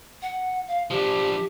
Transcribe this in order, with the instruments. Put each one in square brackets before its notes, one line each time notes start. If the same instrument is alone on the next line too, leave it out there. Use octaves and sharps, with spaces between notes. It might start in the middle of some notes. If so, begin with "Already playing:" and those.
[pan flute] F#5
F5
[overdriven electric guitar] F3 D4 [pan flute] G4